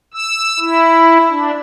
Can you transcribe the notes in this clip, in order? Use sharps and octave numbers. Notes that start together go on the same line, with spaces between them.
E6
E4
D4